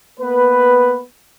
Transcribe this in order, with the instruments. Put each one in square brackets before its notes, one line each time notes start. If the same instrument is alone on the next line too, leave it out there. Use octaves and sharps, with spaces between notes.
[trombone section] A#3 B3 B4